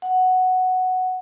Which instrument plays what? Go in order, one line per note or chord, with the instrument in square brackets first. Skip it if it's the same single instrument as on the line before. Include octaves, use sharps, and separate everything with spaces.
[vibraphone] F#5